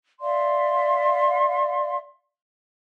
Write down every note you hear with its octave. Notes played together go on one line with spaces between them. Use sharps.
D5 E5 F5 C6